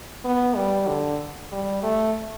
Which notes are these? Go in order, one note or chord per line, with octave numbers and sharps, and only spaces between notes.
B3
G3
D3
G3
A3